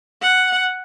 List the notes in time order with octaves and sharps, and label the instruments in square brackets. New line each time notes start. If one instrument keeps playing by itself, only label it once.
[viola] F#5